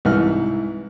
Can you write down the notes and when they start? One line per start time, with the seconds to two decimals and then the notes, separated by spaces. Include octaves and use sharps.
0.05 C2 G#2 E3 E4 F6